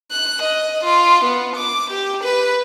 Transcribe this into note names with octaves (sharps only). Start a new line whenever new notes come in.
F#6
D#5
F4
B3
D6
G4
B4